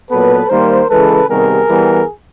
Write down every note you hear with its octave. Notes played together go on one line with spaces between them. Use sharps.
A#2 F#3 B3 A4 B4
D#3 G3 A#3 A#4 C5
C#3 E3 G#3 A4 B4
C3 D#3 G3 B3 G#4 A#4
E3 G3 B3